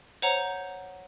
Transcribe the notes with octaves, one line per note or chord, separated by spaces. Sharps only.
C5 C#5 F#5 A#5